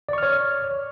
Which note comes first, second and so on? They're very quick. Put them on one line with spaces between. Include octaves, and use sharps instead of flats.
D5 C#6 F6 C#5